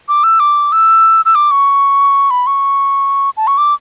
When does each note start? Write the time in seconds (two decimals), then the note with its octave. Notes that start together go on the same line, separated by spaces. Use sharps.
0.08 D6
0.24 E6
0.40 D6
0.72 E6
1.25 E6
1.35 D6
1.51 C#6
2.31 B5
2.47 C#6
3.37 A5
3.47 C#6
3.58 D6